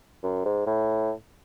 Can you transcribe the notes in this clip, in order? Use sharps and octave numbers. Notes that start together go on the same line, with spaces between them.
F#2
G#2
A2